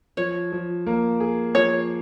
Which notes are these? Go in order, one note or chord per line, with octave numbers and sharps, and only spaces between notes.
F3 C#5
F3
A#3
G#4
F3 C#5